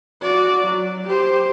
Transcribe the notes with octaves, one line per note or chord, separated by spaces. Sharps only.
F#4 D5
F#3
G4 C5